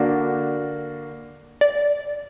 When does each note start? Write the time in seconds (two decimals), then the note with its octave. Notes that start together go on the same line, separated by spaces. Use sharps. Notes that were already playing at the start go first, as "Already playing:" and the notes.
Already playing: D3 A#3 D4 F#4
1.61 D5